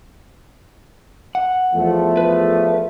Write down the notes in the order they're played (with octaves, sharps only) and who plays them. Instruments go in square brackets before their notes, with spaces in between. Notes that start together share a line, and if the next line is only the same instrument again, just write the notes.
[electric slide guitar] F#5
[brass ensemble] E2 F3 A3
[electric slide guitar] B4